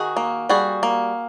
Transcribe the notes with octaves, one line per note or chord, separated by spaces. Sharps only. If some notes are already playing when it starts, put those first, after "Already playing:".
Already playing: D#3 F#4 G#4
A#3
G3 F#4 G#4
A#3